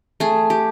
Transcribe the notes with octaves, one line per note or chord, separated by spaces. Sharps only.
A3 G#4
G4